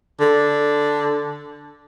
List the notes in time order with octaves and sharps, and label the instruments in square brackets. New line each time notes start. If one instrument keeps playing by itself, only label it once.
[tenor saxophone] D3